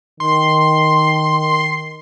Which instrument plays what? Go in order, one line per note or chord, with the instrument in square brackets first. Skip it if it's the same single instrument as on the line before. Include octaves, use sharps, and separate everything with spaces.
[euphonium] D#3 [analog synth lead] C6